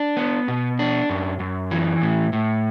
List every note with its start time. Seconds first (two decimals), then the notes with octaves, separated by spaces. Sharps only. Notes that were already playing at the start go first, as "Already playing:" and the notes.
Already playing: D4
0.17 B3
0.48 B2
0.79 D4
1.09 F#2
1.40 F#2
1.71 E3
2.02 A2
2.33 A2